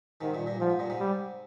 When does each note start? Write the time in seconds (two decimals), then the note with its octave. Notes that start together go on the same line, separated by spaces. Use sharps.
0.21 G#2 C3 D#3
0.34 G2 A#2
0.46 G2 A#2
0.60 G#2 F3
0.70 G#2
0.79 G2 A#2
0.90 G#2 C3
0.99 G3